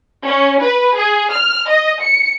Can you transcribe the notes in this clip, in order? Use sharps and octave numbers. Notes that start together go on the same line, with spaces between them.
C#4
B4
G#4
F6
D#5
C#7